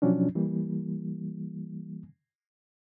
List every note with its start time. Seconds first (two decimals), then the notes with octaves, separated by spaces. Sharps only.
0.02 B2 F3 F#3 C#4 D4
0.35 E3 G3 A#3